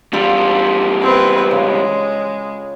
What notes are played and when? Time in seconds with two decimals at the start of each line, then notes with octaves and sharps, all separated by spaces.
0.13 E2 G3 F4 G4 A4
1.03 C4 B4
1.51 C#3 G#3